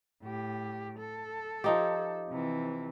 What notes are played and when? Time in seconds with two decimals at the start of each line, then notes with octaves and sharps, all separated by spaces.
0.23 A2 G4
0.99 A4
1.64 F3 D#4 G4
2.29 C3 E3